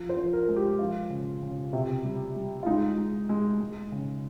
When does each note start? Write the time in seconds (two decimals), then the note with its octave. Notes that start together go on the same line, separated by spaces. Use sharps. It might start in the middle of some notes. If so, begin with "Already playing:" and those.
Already playing: F3
0.09 C5
0.17 F3
0.33 A#4
0.48 G#3
0.56 G4
0.79 F3 F4
1.10 C#3
1.43 C#3
1.73 C3
2.04 G3
2.36 G3
2.63 F4
2.66 G#3 D#4
2.98 G#3
3.29 G#3
3.60 G#3
3.92 C#3